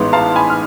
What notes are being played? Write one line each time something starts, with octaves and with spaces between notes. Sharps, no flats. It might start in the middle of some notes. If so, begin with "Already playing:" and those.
Already playing: A1 G#2 G#3 B3
F5 A5
G#5 B5
F6